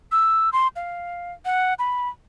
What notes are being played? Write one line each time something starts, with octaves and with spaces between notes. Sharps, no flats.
E6
C6
F5
F#5
B5